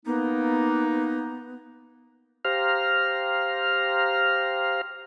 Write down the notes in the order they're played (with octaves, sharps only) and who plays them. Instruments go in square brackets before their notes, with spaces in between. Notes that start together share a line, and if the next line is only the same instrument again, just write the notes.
[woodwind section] A#3 D#4 [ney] B3
[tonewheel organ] G4 C5 F5 A#5 F6